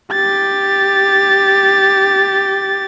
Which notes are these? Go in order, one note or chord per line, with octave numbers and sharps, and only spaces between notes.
G4 A6